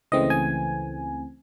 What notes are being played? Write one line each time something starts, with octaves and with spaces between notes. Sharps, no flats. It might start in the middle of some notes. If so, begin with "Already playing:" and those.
C#2 C#3 E3 A3 C4 D#5
G#5